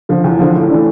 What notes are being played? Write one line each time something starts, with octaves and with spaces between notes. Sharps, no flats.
D3 F3
E2
D3 F3
A2
E3 A3 D4